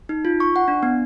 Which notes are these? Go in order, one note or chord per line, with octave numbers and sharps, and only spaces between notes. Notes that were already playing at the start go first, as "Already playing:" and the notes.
D#4
F4
C#6
F#5
D4
B3